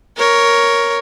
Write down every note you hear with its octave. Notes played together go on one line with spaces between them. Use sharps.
A#4 C#5